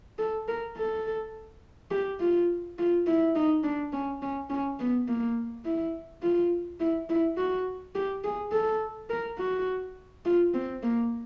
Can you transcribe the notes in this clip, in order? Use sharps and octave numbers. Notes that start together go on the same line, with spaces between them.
A4
A#4
A4
G4
F4
F4
E4
D#4
D4
C#4
C#4
C#4
B3
A#3
E4
F4
E4
E4
F#4
G4
G#4
A4
A#4
F#4
F4
C4
A#3